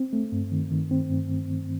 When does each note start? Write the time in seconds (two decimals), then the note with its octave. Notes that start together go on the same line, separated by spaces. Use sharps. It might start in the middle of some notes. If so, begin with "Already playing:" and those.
Already playing: C4
0.13 A3
0.32 G2
0.52 D#3
0.71 D#3
0.91 C4
1.10 G2